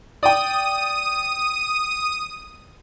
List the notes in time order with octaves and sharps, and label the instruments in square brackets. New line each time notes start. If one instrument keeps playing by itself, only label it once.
[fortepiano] D5 G5 [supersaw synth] D#6 D#7